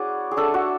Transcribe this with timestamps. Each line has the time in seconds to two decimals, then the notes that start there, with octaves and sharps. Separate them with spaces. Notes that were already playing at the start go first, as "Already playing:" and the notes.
Already playing: C#4 E4 F#4 G#4 D5
0.31 G#4
0.37 A3 D4 A4
0.54 F#4